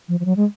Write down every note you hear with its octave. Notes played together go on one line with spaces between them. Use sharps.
F3
F3
F#3
G#3